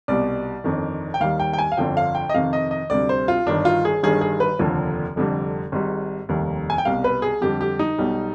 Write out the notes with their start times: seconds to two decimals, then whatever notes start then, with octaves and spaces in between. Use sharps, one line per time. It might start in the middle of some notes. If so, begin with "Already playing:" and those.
0.08 C2 B2 G3 D5
0.64 G1 F2 D#3
1.14 G5
1.20 D#2 D#3 G3 F5
1.40 G5
1.53 G5
1.58 G#5
1.72 F5
1.77 G1 F2 D3 F3 G5
1.97 F5
2.15 G5
2.29 D#5
2.34 F2 C3 D#3 F5
2.53 D#5
2.71 D#5
2.90 D2 C3 G3 D5
3.09 C5
3.28 F4
3.46 G1 G2 D#3 D4
3.65 F4
3.85 G#4
4.03 G1 G2 D#3 G3 G#4
4.21 G#4
4.40 B4
4.59 F1 D#2 D3 F3
5.16 F1 F2 D3 G3
5.72 G#1 G#2 G3
6.29 F1 D#2 D#3 G3
6.70 G#5
6.78 G5
6.85 C2 B2 G3 F5
7.04 B4
7.22 G#4
7.41 F2 D3 G3 G4
7.61 G4
7.79 D#4
7.98 B1 B2 G3